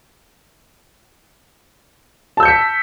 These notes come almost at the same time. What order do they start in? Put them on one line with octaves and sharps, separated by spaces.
A5 E6 G6 C#7 B6